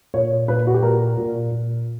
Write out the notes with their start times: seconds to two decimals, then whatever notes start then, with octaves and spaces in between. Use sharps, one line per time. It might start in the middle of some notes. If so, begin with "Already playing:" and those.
0.14 A#2 C#5
0.48 A#2 B4
0.67 F#4
0.74 G4
0.82 A#2 A#4
1.17 A#2
1.51 A#2